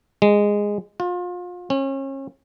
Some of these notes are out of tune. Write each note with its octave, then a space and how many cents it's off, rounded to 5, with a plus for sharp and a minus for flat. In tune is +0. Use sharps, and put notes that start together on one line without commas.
G#3 -10
F4 +30
C#4 -35